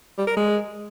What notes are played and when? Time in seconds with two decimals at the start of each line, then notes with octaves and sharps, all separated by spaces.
0.18 G3
0.27 A#4
0.37 G#3